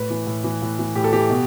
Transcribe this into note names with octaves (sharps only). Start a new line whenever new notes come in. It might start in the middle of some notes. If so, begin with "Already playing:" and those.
Already playing: A2 B4
E3
A2
E3
A2
E3
A2 G4
A4
E3 G4
B2